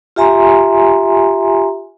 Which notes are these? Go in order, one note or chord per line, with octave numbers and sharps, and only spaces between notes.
F4 G4 E5 G#5 A#5 C6